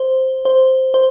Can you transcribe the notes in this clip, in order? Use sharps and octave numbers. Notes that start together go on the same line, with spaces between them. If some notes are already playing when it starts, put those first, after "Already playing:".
Already playing: C5
C5
C5